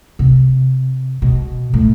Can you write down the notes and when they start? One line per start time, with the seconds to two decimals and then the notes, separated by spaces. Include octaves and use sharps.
0.19 C3
1.22 B2
1.74 A2